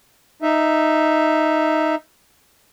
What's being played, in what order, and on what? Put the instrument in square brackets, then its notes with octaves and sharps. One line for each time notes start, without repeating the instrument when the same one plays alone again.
[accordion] D#4 E5